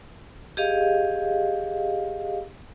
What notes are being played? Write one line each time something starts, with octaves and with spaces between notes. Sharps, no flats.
G4 G#4 D#5 F5